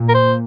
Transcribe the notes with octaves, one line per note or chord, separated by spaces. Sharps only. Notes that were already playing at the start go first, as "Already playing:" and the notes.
Already playing: A#2
A#4
C5